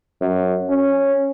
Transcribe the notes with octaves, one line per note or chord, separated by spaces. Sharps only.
F#2
C#4